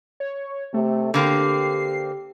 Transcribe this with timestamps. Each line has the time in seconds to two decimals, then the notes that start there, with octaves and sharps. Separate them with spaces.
0.20 C#5
0.74 C3 A3
1.14 D3 A#3 C4 G4 C7